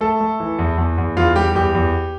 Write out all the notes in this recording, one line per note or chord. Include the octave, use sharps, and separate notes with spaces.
A3 A4
A3
E3
E2
E2
E2
E2 F4
G3 G4
E2 G4
E2